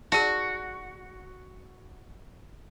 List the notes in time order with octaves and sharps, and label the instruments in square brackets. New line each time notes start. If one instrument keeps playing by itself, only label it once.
[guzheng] F#4 [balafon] G#4 D5 A5